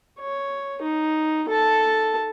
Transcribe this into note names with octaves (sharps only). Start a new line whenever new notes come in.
C#5
D#4
A4 A5